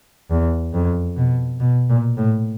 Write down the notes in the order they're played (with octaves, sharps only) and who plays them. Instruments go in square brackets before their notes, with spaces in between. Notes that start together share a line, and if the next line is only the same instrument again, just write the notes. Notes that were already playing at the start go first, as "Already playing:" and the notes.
[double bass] E2
F2
B2
B2
A#2
A2